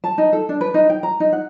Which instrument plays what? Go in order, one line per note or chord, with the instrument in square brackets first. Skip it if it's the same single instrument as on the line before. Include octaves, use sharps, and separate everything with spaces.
[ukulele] A5
D#4
A4
D4
B4
D#4
G5
A#5
D#4
F#5